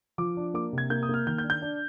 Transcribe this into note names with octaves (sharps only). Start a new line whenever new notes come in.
F3 D6
D4
A#3 D6
C3
G#6
A#3 G6
D#6
A#3
F6
D#3 G6
G6
D4
G6
D4